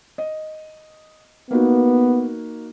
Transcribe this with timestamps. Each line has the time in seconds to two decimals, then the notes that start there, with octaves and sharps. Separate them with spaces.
0.18 D#5
1.51 A#3 B3 D#4 F#4